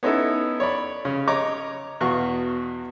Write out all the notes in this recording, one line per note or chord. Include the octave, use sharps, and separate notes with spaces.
B3 C#4 D#4 E4 A4
C#5 D5 B5
C#3
C#5 D#5 A#5 D6
E2 B2 F#4 F5 C#6